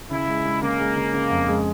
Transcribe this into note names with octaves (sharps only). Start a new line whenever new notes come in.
C#3 E4
G#3
G#3
C#3 A#3
G#3
C#3
C#3
F2
G#3